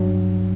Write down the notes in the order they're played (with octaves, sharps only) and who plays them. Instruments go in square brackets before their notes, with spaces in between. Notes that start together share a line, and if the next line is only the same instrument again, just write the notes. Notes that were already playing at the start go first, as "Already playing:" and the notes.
Already playing: [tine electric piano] G2 F#3